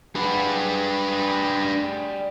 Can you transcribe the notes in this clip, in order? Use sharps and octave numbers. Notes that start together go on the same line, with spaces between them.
D4 G#4 B4 F#5
G3 G#4